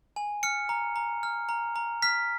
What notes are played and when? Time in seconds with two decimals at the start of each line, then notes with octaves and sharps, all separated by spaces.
0.16 G#5
0.43 F6 C#7
0.69 A#5
0.96 A#5
1.23 F6
1.49 A#5
1.76 A#5
2.02 F6 B6